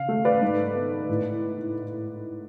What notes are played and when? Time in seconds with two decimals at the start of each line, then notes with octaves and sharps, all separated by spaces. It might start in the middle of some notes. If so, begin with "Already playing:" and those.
Already playing: C#3 F5
0.09 A3
0.25 B4 D5
0.42 G#2
0.75 B3
1.09 A2